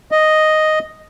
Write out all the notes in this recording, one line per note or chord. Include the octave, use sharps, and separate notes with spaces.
D#5